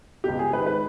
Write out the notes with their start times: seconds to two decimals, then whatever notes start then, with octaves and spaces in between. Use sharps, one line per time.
0.24 C#2 B2 G4
0.39 G#4
0.53 G#2 D#3 B4
0.66 B4